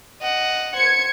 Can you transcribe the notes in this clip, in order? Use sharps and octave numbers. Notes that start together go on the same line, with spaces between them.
D#5 F#5
C5 G#6 C#7